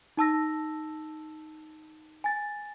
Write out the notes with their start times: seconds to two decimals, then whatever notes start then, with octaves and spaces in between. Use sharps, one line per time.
0.17 D#4 A5 E6 A#6
2.24 G#5 A6